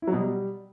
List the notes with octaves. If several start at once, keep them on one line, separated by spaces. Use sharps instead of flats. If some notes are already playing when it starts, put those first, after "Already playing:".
E4
F#3
B2
G3